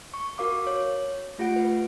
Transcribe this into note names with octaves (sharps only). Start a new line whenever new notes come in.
C#6
F#4 A#4 F5 D6
C#5
A3 F4 G4 F#5 D7
B4